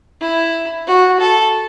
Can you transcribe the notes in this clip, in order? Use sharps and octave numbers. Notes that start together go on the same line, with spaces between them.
E4
F#4
A4